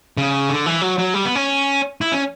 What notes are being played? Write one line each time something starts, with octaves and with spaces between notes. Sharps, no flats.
C#3
D3
E3
F#3
F#3
G3
B3
C#4
E4
C#4